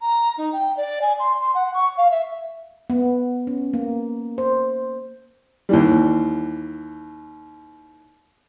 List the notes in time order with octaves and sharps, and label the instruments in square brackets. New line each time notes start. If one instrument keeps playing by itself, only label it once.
[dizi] A#5
D#4
G5
D5
G#5
C6
C6
F#5
C#6
F5
E5
[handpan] B3
C#4
A#3
C5
[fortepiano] D#2 E3 G3